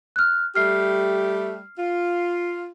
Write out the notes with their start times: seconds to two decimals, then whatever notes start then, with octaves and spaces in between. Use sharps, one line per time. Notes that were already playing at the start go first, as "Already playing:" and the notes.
0.16 F6 F#6
0.55 G3 A3 G4 F6 C7
1.78 F4